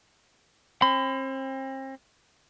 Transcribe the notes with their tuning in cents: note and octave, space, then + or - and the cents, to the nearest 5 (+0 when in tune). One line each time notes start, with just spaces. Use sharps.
C4 +35 B5 +45